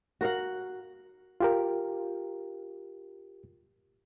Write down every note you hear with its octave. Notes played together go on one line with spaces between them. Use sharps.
F#4 A#4 F5 F#5
F4 G4 A#4